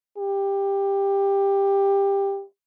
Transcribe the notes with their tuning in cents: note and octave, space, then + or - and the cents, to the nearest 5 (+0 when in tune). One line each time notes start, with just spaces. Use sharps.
G4 +15